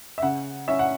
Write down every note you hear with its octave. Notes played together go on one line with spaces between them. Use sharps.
E5
C#3 F#5
C#4 E5
F#5